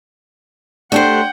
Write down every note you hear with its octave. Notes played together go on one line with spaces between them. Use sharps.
A3 D4 G4 C5 F#5 G5